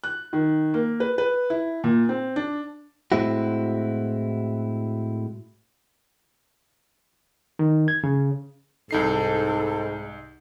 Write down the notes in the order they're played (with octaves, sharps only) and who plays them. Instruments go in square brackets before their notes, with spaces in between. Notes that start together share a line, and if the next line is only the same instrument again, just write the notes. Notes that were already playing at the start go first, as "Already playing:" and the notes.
[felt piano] F#6
D#3
A#3
B4
B4
E4
A#2
C4
D4
[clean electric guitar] A2 G#3 C4 E4 F#4
[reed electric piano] D#3
G#6
C#3
[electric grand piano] C2 D#4 C7 [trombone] G#2 [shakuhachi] A4